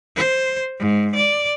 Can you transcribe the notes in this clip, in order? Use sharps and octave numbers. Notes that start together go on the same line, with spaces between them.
C5
G#2
D5